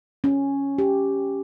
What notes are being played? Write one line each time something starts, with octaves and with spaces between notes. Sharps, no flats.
C#4
G4